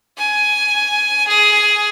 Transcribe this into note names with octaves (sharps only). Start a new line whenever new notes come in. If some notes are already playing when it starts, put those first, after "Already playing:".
G#5
G#4